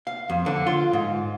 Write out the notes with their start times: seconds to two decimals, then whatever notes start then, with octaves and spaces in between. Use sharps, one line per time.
0.07 F5
0.30 F2
0.46 D3
0.67 F4
0.93 G#2